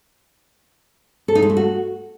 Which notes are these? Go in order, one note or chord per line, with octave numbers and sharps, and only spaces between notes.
A4
D#4
G#3
A3
F#4